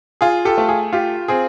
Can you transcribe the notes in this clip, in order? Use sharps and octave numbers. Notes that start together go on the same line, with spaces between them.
F4 G#4
G4 A4
A3
G#4
F4 G4
C4 G#4